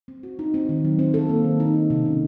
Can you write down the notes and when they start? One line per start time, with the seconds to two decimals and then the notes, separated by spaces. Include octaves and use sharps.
0.08 C4
0.23 F#4
0.39 D#4
0.54 C4
0.69 D#3
0.85 F#3
0.99 C4
1.14 A4
1.29 A#3
1.44 D#3
1.60 D#4
1.74 A#3
1.90 C3
2.05 C#4